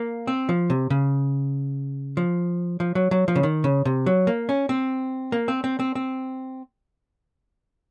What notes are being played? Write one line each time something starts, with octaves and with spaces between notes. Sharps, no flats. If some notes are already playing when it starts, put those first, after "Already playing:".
Already playing: A#3
C4
F3
C3
C#3
F3
F3
F#3
F#3
F3
C#3
D#3
C#3
C3
F#3
A#3
C#4
C4
A#3
C4
C4
C4
C4